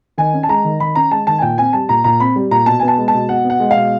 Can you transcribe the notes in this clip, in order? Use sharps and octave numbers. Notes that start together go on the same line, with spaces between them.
D#3 G#5
C#4
A5
G#3 A#5
D#3
D#3 B5
C#4 A#5
G#3 A5
D#3 A5
G#5
A#2 G5
C4 G#5
G3 A5
A#2 A#5
A#2 A#5
C4 B5
G3
A#2 A#5
B2 A5
B3 G#5
A5
G#3
A5
B2
B2 F#5
B3
F#5
G#3
F5
B2